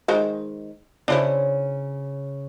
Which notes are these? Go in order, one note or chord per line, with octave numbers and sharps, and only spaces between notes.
D#3 G#3 C5
C#3 D4 E4 C5